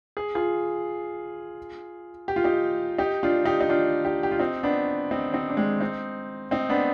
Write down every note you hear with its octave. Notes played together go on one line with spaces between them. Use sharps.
G#4
F4 G#4
G4
F4
D#4 G4
D#4 G4
D4 F4
D#4 G4
D#4
D4 F4
D#4 G4
G4
F4
C4 D#4
B3 D4
C4 D#4
C4 D#4
D4
G#3 C4
C4 D#4
C4 D#4
B3 D4